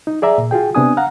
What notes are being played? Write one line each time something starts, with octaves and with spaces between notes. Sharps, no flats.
D#4
G#4 D5 E5 A#5
A#2
F4 F#4 G#4 G5
C3 B3 D4 G#5 D#6
F5 F#5 A#5